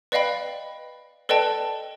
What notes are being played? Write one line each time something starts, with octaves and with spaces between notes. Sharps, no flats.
B4 D5 D#5 F5 G5 B5
A4 B4 D5 D#5 G5 A5